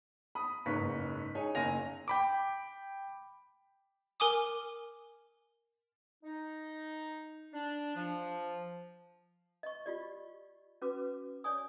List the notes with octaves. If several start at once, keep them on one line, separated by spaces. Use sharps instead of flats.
B5 D#6
F#1 G#2 B4 C#6 B6
D#4 G#4 C#5 G#5
F#1 G#5 A#6 F7
G5 B5 D6
A#4 G#5 D6 D#6
D#4
D4
F3
D#5 C#6
F4 G4 D5
C#4 F#4 B4 D6
C#5 D5 G#5 D#6